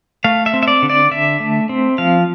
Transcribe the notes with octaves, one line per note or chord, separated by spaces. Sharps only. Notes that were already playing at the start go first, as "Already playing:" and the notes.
A3 F5
E5
C4
E5
D5
D3
D5
D3 E5
A3
C4
F3 F5